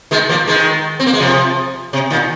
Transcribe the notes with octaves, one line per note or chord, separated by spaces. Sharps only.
D#3 G#3
F3 A#3
D#3 G#3
C4
A#3
G#3
C3 F3
C3
A#2 D#3